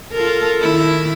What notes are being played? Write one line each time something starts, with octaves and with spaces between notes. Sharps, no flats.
F4 A4 A#4
D#3 E4